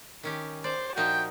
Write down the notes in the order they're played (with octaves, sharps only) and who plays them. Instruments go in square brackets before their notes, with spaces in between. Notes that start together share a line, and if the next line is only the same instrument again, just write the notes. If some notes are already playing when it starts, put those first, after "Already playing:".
[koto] D#3 C#4 G4
[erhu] C5 [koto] D5
[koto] A#2 F3 D#4 [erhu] F#4 [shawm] G5